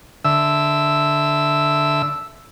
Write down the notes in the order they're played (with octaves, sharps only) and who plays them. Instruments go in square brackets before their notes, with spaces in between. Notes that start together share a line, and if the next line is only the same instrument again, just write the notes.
[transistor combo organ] D3 E5 E6